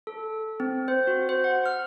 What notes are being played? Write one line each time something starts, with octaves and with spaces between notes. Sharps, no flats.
A4
C4
C5
F#4
C5
F#5
F6